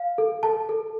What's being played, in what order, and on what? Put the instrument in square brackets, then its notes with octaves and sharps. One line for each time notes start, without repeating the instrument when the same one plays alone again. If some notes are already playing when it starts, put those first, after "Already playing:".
Already playing: [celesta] F5
A4
A4 A5
A4